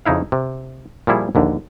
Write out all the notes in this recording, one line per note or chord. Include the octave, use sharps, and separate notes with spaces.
F2 C#3 D#4 E4 F5
C3
A#2 F3 G3 E4 G#4
A#1 D#2 D3